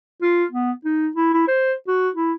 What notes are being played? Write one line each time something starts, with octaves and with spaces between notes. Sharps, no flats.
F4
B3
D#4
E4
E4
C5
F#4
E4